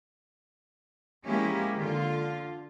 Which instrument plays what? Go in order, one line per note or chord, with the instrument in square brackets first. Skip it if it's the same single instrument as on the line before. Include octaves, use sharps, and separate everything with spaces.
[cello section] F3 G#3 A#3 C#4 E4 G4
D3 F4